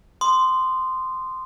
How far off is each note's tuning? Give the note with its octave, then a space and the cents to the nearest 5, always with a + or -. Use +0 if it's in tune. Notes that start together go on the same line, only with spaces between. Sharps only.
C6 -10 D#6 -35